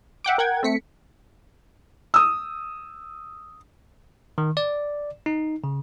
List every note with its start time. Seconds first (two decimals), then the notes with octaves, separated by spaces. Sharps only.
0.24 E5 F#5 G5 D6
0.38 A#4 F#5 G5 G#6
0.63 A3 C4 B6 C#7
2.14 D#6 E6
4.38 D#3
4.57 D5
5.26 D#4
5.64 C#3